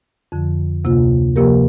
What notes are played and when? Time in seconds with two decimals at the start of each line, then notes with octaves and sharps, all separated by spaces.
0.32 F2 D3 F3
0.84 D2 C3 A#3 F4
1.36 C3 F3 A#3 G4 A#4